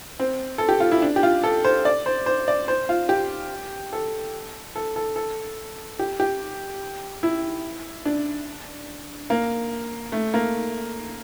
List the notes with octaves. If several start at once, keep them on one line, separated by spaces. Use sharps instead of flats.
C4
A4
G4
F4
E4
D4
G4
F4
A4
C5
D5
C5
C5
D5
C5
F4
G4
A4
A4
A4
A4
G4
G4
E4
D4
A#3
A3
A#3